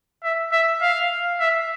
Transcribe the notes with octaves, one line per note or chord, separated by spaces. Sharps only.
E5
E5
F5
E5